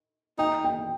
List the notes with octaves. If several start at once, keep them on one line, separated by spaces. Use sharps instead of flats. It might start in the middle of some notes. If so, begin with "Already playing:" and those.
D#4 G5
G5